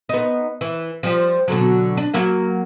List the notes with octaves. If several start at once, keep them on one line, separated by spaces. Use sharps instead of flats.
B3 D#4
E3
F3 G3
B2 D3 F#3
D4
F#3 A#3 F5